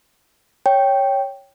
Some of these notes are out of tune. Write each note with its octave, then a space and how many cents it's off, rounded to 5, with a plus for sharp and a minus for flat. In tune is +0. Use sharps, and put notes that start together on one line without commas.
C#5 +0 G5 +0